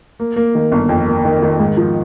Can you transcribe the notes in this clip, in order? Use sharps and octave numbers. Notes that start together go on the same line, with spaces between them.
A#3
A#3
D#3
G1
F2
A#3
D#3
D#3
G#2
F3